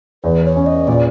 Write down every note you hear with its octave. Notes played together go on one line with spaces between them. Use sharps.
E2 B4
C#5
C#4
D#5
A#2 D5